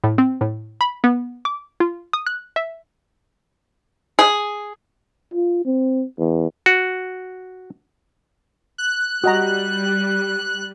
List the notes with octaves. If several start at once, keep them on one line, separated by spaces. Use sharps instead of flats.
A2
C4
A2
B5
B3
D6
F4
D#6
F#6
E5
G#4
F4
C4
E2
F#4
F#6
G3 F#4 D#5 A#5